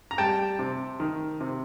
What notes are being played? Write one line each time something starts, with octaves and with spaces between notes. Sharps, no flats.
A#5
G3 G5 A5
C3
D#3
C3